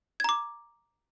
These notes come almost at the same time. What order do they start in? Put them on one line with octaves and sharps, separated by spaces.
G#6 A#5 D6